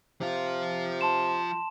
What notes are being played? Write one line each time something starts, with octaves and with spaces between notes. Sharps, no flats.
C3 F3 F4
A5 C6 E7